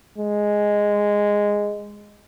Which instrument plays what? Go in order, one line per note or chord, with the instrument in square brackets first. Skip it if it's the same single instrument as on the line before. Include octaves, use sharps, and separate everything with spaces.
[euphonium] G#3